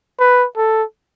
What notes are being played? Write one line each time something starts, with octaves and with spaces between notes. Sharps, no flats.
B4
A4